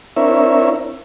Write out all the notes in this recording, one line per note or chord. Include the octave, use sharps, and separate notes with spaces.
C4 D4 E4 A#4 C#5 E5